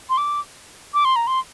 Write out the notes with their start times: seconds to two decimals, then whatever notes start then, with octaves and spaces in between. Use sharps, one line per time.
0.10 C6
0.18 D6
0.94 D6
1.05 C6
1.16 A#5
1.27 C6